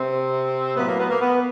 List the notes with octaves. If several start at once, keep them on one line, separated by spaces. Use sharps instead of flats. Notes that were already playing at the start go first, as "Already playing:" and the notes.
Already playing: C3 C4
A2 F#3 A#3 B3
A#3
B3
A#3
B3